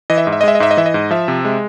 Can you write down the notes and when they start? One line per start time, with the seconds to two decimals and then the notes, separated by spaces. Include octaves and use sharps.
0.10 E3 D#5
0.18 E5
0.25 G#2 D#5
0.32 E5
0.41 D#5
0.43 G#3 E5
0.55 D#5
0.60 G#2 E5
0.71 D#5
0.77 E3 E5
0.86 D#5
0.94 G#2
1.11 F3 E5
1.28 C3
1.45 G#3